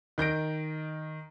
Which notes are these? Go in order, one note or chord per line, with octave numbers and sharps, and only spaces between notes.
D#3 G6 A#6 D7